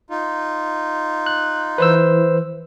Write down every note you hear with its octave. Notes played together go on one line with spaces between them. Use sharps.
D#4 F4
F#6
E3 B4 C5 E6